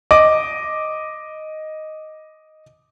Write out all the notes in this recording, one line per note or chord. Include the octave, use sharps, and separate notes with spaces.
D#5 D6